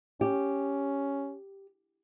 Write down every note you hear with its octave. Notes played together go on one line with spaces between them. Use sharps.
C#4 G4